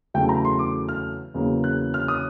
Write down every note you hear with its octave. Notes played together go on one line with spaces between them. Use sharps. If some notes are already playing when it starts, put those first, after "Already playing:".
E2 C#3 F#3 A3 G5
A#5
C6
D6
F6
E2 C#3 F#3 A#3
F#6
F6
D#6